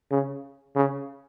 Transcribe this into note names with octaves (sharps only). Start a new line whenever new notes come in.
C#3
C#3